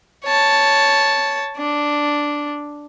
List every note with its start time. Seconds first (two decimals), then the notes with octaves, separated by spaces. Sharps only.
0.25 C#5 A5
1.57 D4